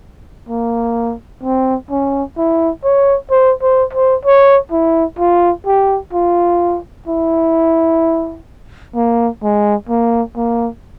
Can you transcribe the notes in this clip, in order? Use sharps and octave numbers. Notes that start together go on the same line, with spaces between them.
A#3
C4
C#4
E4
C#5
C5
C5
C5
C#5
E4
F4
G4
F4
E4
A#3
G#3
A#3
A#3